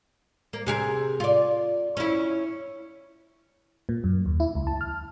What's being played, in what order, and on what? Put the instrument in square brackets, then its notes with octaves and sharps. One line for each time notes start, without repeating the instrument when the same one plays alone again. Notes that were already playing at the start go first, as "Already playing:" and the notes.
[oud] A#3
C3 G#4 A#4
F4 D5
C#4 E4
[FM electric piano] A#2
F#2
D#2
E4
C#2
A5
F6